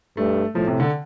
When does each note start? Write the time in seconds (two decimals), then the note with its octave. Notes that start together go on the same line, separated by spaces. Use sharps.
0.17 G2 A3
0.55 A2 F3
0.67 C3
0.80 D3